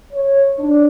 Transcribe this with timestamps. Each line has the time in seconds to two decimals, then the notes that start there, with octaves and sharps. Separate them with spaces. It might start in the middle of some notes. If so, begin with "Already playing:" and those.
0.12 C#5
0.58 D4